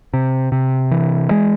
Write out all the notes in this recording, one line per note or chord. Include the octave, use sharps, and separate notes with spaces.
C3
C3
E3
G#3